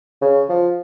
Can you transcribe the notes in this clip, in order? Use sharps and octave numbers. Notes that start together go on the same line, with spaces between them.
C#3
F3